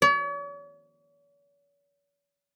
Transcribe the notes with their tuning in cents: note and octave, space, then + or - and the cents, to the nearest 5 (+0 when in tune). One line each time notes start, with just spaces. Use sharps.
C#5 +45